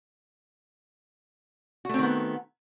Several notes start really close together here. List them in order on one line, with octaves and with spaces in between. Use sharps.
F#4 A3 C4 D#3 B3